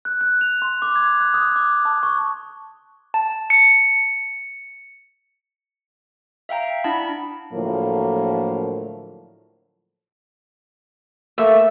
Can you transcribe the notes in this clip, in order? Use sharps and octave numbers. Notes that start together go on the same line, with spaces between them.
F#6
F#6
F7
C6
D6
G#6
F#6
D#6
D6
A5
C#6
A5
C#7
E5 F5 G5 A#5
D4 E4 F#5 A5 B5
A2 D3 F3 F#3 A#3
A3 A#3 E5